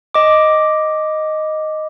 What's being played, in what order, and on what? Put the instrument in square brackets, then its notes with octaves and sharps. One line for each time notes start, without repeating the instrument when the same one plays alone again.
[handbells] D#5 D6